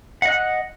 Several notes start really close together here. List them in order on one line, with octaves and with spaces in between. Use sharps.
F#5 D#5 F#6